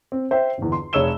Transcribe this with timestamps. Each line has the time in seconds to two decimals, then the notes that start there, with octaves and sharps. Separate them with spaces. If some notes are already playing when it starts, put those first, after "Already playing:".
0.12 C4
0.31 C5 E5 G5
0.58 G1 E2
0.72 C6
0.93 F1 G#4 C#5 E6 E7 G7